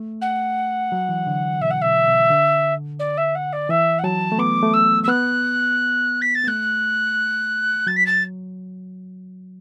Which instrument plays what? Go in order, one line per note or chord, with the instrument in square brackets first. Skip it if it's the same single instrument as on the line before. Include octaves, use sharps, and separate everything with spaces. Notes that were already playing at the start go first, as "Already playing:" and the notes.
Already playing: [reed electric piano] A3
[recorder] F#5
[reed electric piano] F#3
E3
D3
[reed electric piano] B2 [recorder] E5
[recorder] F#5
[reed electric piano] B2 [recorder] E5
[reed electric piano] B2
D3
[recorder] D5
E5
F#5
D5
[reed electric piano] E3 [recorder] E5
[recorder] F#5
[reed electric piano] F#3 [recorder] A5
[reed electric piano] A3
[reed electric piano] B3 [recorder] D6
[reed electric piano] A3
[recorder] E6
E6
[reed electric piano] B3 [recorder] F#6
[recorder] B6
A6
[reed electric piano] B3
[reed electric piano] A3 [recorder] F#6
[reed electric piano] F#3 [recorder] A6
[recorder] B6
A6